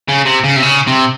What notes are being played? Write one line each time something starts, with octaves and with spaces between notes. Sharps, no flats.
C#3
C3
C#3
C3
C#3
C3